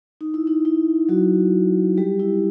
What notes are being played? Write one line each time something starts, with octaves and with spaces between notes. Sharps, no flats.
D#4
E4
D#4
E4
F#3 F#4
G3 G4
E4